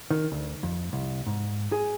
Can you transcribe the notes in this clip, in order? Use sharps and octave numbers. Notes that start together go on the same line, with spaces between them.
D#3
D2
F2
C2
G#2
G#4